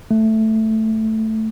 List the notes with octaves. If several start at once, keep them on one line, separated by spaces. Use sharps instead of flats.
A3